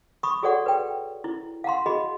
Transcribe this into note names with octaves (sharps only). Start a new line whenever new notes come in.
B5 C#6 D#6
F#4 G#4 A4 C#5 D5 F#5
B4 G5
E4
F5 F#5 A#5 C6
F#4 G#4 D#5 B5 C6